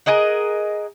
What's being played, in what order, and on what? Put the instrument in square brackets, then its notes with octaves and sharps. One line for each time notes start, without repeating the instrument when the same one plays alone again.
[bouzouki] G#4 A#4 D#5 F#5